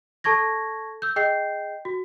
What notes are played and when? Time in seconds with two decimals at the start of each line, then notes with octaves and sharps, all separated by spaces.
0.24 A4 A5 C#6 G#6 A#6
1.02 E6 G6
1.16 G#4 D#5 G5 G6 C7
1.85 F#4